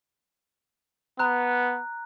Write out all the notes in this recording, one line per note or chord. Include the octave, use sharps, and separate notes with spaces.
B3 A#5 F#6